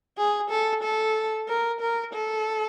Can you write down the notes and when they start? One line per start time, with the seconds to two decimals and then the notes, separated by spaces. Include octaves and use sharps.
0.18 G#4
0.50 A4
0.83 A4
1.48 A#4
1.81 A#4
2.14 A4